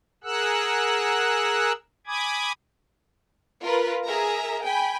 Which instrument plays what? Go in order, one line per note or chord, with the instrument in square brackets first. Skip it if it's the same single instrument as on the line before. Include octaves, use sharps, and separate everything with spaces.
[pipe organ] G#4 A#4 F#5 E6 F#6
G#5 B5 D6 D#6 G#6
[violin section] F4 A#4 B4
G#4 A#4 E5 A#5
G5 G#5 B5